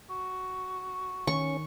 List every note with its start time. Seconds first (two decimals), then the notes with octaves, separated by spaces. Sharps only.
0.10 F#4
1.27 D#3 C#4 C#6